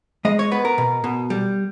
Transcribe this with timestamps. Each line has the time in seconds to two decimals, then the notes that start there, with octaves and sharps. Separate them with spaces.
0.25 G#3 D#5
0.39 C#5
0.51 B3 B4
0.65 A#4
0.78 B2
1.04 B2
1.30 G3